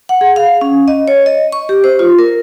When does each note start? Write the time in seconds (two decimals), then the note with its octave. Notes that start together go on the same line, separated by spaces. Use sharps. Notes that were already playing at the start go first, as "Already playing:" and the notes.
0.09 F#5
0.21 G#4
0.36 F5
0.61 C#4
0.88 D#5
1.08 C#5
1.26 D#5
1.53 C#6
1.69 G4
1.84 C5
1.99 F4
2.19 A#4